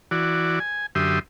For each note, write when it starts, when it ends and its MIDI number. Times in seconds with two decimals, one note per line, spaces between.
0.11 0.59 52
0.11 0.59 66
0.11 0.59 74
0.60 0.86 80
0.95 1.19 42
0.95 1.19 50
0.95 1.19 67
0.95 1.19 76
0.95 1.19 84
0.95 1.19 87